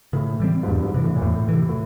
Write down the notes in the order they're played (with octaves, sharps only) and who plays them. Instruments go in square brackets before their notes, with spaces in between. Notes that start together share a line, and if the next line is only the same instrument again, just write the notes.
[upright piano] A2 [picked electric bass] C#3
[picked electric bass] E3 G3 C4
[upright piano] G#2
[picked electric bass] E2 [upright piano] G2
[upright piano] G2
G#2
[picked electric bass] C3 E3
[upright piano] A2
A#2
[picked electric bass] E2 [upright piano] A2
[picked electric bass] C3 E3
[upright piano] A2